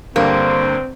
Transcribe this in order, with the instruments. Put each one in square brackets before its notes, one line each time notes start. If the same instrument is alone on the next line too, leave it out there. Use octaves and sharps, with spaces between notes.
[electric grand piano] G2 D3 [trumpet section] G3 C5 [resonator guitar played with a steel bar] A#3 [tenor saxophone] C4